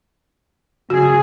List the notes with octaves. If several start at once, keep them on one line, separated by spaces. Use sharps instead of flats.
C#3 F#4 G#4